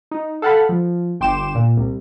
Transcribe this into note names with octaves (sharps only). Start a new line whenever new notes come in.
D#4
A4 F5 F#5 A5 B5
F3
G1 G5 C6 D6 E7
A#2
C2